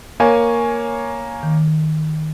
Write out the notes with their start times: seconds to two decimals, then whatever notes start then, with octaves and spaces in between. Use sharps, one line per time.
0.20 A#3 C#5 G#5
1.43 D#3